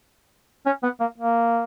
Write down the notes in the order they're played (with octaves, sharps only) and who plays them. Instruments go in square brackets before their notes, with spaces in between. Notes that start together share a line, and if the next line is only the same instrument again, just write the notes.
[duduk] C#4
B3
A#3
A#3